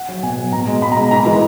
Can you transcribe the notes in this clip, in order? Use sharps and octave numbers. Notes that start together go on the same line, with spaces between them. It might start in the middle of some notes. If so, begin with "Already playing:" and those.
Already playing: F#5
F#3
B2 G#5
F#3
B2 A#5
G#3
B2 B5
A#5
G#3
G#2 A#5
E3 G#3